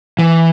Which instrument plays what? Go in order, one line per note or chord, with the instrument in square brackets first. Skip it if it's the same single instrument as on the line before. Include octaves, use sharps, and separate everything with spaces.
[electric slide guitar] E3